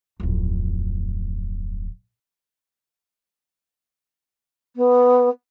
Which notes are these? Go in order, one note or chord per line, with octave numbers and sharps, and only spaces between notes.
D1 F2
B3